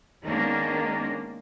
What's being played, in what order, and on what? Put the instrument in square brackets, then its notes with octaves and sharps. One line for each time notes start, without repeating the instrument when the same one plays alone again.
[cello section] D#3 G#3 A#3 B3 C#4 D4